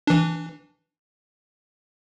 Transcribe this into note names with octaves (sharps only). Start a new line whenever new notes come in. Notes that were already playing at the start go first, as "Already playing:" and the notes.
E3 D4